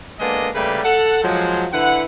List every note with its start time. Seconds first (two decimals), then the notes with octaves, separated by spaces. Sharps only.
0.20 G#3 A#3 B3 D4 A4 D#5
0.55 C#3 G3 A3 A#3 G4 B4
0.84 A4 F#5
1.23 F3 F#3 G#3
1.72 D3 E4 B4 F#5